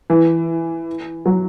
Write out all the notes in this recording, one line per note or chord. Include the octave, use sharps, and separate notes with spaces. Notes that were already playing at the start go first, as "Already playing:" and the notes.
E3
F#3